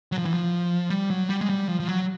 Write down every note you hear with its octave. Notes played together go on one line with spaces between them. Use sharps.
F#3
F3
E3
F3
G3
F#3
G3
G#3
G3
F3
F3
F#3